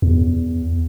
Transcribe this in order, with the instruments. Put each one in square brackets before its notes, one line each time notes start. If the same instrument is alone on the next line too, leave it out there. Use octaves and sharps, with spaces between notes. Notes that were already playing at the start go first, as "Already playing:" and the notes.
[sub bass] E2